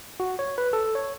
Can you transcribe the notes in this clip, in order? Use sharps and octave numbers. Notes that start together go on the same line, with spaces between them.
F#4
C#5
B4
A4
C#5